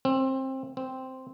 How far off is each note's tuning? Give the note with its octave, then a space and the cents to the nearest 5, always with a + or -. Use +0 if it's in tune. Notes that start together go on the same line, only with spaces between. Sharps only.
C4 +20
C4 -5